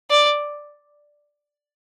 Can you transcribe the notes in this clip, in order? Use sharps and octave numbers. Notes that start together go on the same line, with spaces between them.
D5